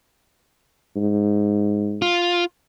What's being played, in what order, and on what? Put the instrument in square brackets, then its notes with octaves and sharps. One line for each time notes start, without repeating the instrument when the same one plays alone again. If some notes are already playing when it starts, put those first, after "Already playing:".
[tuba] G#2
[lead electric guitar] F4